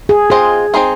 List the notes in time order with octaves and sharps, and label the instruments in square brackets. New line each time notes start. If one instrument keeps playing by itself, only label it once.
[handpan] G#4
[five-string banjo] G#3 C4 F4 C5 D#5 [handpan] G#4
[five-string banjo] C4 D#4 G#4 C5